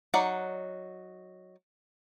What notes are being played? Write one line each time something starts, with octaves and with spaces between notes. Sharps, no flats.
F#3 D#4 D5 F#5